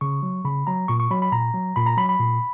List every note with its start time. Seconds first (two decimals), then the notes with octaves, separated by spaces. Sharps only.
0.01 C#3 C#6
0.23 F#3
0.45 C#3 B5
0.67 F#3 A#5
0.88 A#2 C#6
1.00 C#6
1.10 F#3 B5
1.22 B5
1.32 A#2 A#5
1.54 F#3
1.76 A#2 B5
1.86 A#5
1.97 F#3 B5
2.09 B5
2.20 A#2